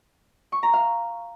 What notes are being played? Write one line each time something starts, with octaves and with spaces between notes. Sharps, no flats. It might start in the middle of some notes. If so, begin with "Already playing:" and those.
C#6
A#5
F5